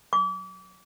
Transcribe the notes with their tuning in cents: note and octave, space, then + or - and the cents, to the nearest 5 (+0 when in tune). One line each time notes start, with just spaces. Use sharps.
D6 -35